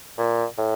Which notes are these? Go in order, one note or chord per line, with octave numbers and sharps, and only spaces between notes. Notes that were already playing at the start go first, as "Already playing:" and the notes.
A#2
A2